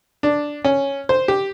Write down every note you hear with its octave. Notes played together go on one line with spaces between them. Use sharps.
D4
C#4
C5
G4